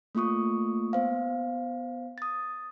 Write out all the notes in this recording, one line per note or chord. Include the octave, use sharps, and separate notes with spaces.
A3 A#3 F4 C#6 D#6
B3 C5 F5
D#6 A6